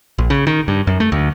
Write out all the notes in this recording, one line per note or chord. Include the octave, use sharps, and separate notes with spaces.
A#1
C#3
D#3
G2
F#2
A3
D2